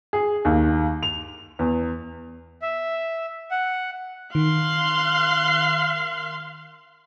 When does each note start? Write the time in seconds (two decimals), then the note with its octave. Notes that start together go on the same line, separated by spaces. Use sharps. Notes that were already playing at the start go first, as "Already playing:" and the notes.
0.13 G#4
0.45 D#2
1.03 F7
1.59 E2
2.62 E5
3.51 F#5
4.35 D#3 F5 C6 F#6